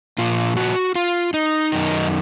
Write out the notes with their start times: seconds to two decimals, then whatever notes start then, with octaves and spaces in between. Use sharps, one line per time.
0.18 A#2 F3 F4
0.57 F#4
0.95 F4
1.34 D#4
1.72 F#2 D#3 D#4